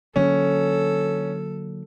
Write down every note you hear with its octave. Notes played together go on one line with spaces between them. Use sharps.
D3 F#3 A#3 C#4 A4